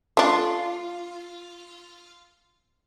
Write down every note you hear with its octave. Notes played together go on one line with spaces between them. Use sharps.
A3 D4 F4